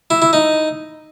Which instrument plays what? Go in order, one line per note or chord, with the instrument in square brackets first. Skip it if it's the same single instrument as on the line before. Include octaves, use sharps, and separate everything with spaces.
[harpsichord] E4
E4
D#4